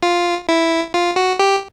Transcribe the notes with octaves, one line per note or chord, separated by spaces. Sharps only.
F4
E4
F4
F#4
G4